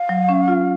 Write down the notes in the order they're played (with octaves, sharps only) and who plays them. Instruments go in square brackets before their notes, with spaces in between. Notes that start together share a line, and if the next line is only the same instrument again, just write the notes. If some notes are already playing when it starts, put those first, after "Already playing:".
Already playing: [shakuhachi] F5
[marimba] F#3
C#4
F4